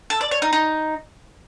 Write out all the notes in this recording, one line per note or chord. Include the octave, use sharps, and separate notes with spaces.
A4
D5
C#5
D#4
D#4